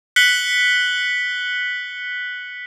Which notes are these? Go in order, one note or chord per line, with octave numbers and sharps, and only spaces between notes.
F#6 B6 C#7 F#7 G7